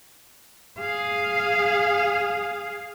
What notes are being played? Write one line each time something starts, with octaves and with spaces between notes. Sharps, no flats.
G#4 F5